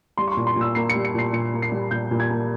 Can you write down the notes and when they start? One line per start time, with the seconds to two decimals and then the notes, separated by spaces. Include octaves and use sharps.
0.17 G3 C6
0.28 C#6
0.32 C6
0.37 A#2
0.47 C6
0.56 A#2 E6
0.75 A#3 C7
0.90 C#7
0.95 G3
1.05 C#7
1.14 A#2 C7
1.33 A#2 C#7
1.53 A#3
1.62 C7
1.72 G3
1.91 A#2 G6
2.11 A#2
2.20 G#6
2.30 A#3